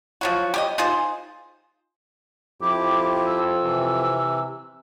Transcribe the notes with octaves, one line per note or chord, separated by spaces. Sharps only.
F3 F#3 F#4
G4 C#5 D#5
D#4 F4 G#4 C5
F2 E4 G4 D6
E6
C3 E3